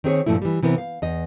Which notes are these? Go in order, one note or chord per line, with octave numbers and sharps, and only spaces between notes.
D#3 C4 G#4 C#5
G2 A#2 F3 A3 E4
E3 G3
C3 E3 B3 A#4
F5
E2 D#5